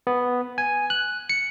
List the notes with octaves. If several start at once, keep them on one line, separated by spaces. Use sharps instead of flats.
B3
G#5
F#6
C#7